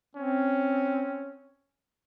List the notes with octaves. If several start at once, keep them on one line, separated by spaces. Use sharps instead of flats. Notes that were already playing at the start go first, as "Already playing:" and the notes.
C4 C#4